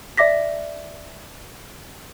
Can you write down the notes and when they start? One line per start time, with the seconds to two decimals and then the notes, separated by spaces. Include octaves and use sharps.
0.18 D5 E5 D6 A#6 B6